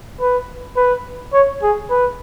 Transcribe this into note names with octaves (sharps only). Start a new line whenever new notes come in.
B4
B4
C#5
G#4
B4